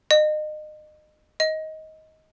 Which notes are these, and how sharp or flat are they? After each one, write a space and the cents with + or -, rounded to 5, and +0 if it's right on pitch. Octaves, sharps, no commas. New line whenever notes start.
D#5 -30
D#5 +15